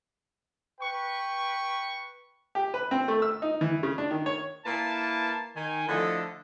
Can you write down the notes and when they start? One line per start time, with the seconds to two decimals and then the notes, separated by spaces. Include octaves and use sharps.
0.81 B4 G5 C#6
2.55 G4
2.74 B4
2.91 C4
3.08 A3
3.22 E6
3.42 D#4
3.61 E3
3.83 C#3
3.98 D4
4.11 D#3
4.26 C#5
4.65 A#3 E4 B4 A5
5.56 D#3 G#5
5.88 D3 F3 A3 E4 A4 D#5